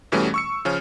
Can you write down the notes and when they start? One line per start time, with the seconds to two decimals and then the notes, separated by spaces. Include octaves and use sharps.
0.12 E2 B2 E3 G3 A3 C#4
0.34 C#6 E6 C#7
0.65 C#3 F3 C#4 F6